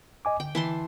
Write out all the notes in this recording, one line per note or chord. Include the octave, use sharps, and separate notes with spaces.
D#5 G#5 D6
D3 G5
E3 A5 C6